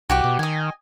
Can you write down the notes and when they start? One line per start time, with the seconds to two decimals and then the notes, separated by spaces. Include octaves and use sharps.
0.10 C2 F#4 G4 D6
0.24 B2
0.39 D#3 D#5 G#5